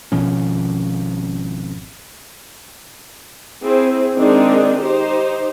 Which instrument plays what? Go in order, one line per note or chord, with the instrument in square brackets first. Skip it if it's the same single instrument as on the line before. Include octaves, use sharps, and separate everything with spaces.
[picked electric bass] G#1 B2 F3 C#4
[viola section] C4 E4 G#4
D#3 G#3 C4 D4 D#4
D#4 G4 C5